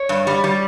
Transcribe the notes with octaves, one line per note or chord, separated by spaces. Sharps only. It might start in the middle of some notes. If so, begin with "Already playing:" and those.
Already playing: C#5
G2
G3
G3